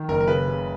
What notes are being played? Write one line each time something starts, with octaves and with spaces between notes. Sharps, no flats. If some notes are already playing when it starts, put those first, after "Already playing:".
Already playing: D#3
F#1 A#4
A#4
C#3 B4
C#3